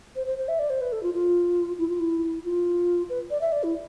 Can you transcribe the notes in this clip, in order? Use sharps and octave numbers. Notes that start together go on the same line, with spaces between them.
C5
C5
C5
E5
D5
C5
B4
A4
F4
F4
E4
F4
E4
F4
B4
D5
E5
D5
E4